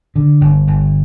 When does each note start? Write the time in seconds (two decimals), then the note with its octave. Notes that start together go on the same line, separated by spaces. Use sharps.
0.16 D3
0.41 G1
0.67 G1